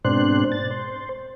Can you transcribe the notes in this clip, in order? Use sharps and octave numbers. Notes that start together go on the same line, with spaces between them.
G#2 B2 C4 D4 C5 F#6
A6
C5